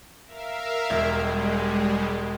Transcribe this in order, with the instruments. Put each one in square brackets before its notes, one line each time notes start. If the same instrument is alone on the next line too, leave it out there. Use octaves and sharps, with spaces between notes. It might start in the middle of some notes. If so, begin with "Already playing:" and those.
[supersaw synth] A#4 E5 F5
[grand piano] E1 [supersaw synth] G3 G#3